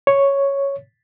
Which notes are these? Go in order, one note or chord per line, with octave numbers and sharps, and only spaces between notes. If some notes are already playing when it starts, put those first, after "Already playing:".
C#5